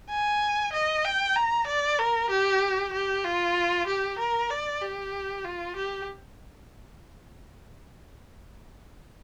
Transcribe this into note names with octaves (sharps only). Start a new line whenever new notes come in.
G#5
D#5
G5
A#5
D5
A#4
G4
G4
F4
G4
A#4
D5
G4
F4
G4